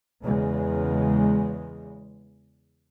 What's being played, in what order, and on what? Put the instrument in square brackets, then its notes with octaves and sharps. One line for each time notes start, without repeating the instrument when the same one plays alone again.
[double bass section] E2 C#3 G#3